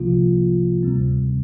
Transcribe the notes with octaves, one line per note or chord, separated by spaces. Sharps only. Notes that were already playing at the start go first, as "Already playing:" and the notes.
Already playing: C2 C3 F3 A#3 F4
D2 C3 G3 C4